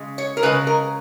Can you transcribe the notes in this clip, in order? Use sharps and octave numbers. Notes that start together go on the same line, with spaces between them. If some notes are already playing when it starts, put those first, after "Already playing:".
Already playing: C#3 G#3
C#5
A#4
C#3 G#3 B4
A#4